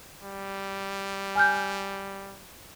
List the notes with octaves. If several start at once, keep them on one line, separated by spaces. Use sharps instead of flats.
G3
G#5 F6 G6